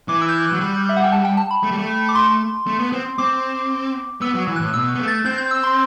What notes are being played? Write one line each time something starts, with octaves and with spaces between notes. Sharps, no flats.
E3 D6
E6
G6
F#6
F#6
F#3
G3
E5
F#5
G5
A5
G5
A5
B5
A3
G3
A3
D6
C6
A3
B3
C4
C4 D6
B3 E6
F#3
E3
A2 F#6
B2 E6
B3
A3
A6
C4 G6
G6
E6
C6